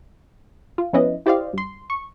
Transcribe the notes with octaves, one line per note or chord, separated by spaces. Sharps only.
F4
F3 B3 C#4 E4 B4 D#5
E4 G4 C5 D5 D#5 F5
G2 C6
C#6